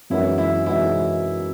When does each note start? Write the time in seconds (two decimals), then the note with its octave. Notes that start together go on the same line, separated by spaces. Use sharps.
0.10 F#2 E3 G#3 D#4 E4 F#4
0.38 E4
0.66 E3 G#3 D#4 E4 F#4